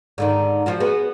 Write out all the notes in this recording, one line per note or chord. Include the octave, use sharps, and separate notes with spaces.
G#2 D3 D#3
F3 F4 F#4
B3 F#4 G#4